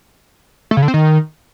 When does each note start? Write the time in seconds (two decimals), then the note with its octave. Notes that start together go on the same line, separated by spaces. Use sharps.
0.71 A3
0.77 C#3
0.82 D3
0.88 C4
0.94 D#3